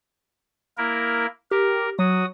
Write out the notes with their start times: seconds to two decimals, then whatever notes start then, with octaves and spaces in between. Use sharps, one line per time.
0.77 A#3 E4 A#4
1.51 G4 A#4
1.99 F#3 F#4 D#6